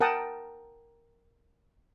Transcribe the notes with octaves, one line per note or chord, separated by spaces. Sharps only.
A#4 F#5 G5 A5 D#6